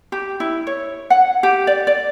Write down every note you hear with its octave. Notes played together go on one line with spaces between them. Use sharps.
G4
E4
C#5
F#5
G4
D5
D5